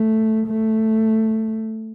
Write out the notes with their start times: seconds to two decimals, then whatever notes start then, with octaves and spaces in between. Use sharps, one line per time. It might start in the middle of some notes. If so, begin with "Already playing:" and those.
Already playing: A3
0.47 A3